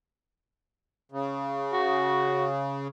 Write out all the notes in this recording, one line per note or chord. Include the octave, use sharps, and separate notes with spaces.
C#3
F#4